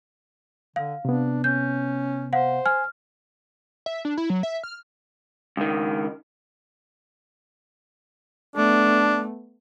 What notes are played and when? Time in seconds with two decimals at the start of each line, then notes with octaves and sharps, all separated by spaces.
0.76 D3 F5
1.05 C3 B3 D4
1.44 C#4 G6
2.33 C5 F5 F#5
2.66 G#5 F6
3.86 E5
4.05 D4
4.17 E4
4.30 F#3
4.43 E5
4.63 F6
5.57 C#2 D#3
8.56 A3 B3 D4